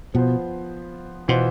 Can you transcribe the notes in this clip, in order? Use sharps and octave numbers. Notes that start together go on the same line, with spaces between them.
B2 F3 B3 F4 C5
B2 E3 B3 F4 C5